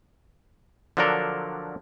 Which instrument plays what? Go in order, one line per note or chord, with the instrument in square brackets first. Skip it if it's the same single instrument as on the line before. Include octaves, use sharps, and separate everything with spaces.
[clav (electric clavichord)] D3 F3 F#3 D4 A4 A#4